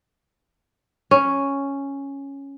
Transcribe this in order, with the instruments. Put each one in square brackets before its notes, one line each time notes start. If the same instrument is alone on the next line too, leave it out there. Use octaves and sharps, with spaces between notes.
[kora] C#4